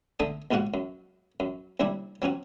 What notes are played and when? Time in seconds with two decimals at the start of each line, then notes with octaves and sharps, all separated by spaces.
0.20 D3 A3 A4 E5 D#6
0.51 A#1 D#2 G#2 F4 F#4 F#5
0.74 F#2
1.40 F#2
1.80 D#2 C3 G3 D4 E4
2.22 F#3 C4 C#4 F#4